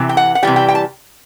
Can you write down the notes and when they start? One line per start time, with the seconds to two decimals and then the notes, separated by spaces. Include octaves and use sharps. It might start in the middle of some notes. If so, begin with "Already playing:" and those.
Already playing: C3 E3
0.09 G5
0.17 F#5
0.35 F#5
0.43 C3 E3 G3 G5
0.56 G5
0.69 G5
0.75 A5